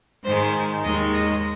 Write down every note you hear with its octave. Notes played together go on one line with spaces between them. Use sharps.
G#2 D#3 G#3 C5
D#2 D#3 G#3 D#5
D#5